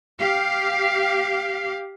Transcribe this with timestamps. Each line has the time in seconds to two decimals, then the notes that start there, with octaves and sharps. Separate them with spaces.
0.20 G4 F5